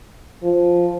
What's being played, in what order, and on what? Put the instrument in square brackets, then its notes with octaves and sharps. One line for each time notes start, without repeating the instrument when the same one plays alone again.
[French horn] F3